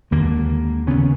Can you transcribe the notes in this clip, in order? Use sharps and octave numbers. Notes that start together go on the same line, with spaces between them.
D#2 D3 G#3 A#3
D#2 C#3 B3 C#4